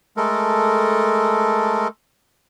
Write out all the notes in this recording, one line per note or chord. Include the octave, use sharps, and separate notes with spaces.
G#3 A3 A4 A#4